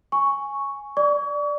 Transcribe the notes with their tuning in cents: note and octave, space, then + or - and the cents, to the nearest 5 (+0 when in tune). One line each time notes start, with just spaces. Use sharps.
G#5 +0 C#6 +0
D5 +0 C#6 +40